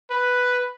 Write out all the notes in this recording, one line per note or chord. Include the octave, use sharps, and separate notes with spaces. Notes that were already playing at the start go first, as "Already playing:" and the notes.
B4